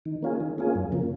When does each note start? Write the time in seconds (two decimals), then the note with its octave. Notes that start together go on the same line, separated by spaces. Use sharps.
0.05 D#3
0.22 A#3 C#4 F4 G#4
0.40 D#3
0.58 A#3 C#4 F4 G#4
0.75 F#2
0.92 C#3 F3 A#3